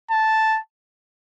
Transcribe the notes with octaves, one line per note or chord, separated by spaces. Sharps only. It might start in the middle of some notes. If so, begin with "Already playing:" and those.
A5